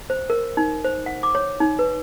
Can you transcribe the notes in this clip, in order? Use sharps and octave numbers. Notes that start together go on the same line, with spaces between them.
C5
A#4
D#4
C5
F#5
D6
C#5
D#4
B4